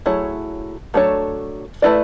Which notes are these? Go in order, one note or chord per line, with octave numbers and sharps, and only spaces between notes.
F#3 A3 E4 G#4 C#5
F#3 A3 D4 A4 C#5
A3 E4 B4 D5